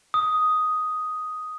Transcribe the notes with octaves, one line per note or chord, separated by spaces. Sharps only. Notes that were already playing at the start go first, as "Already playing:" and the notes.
D#6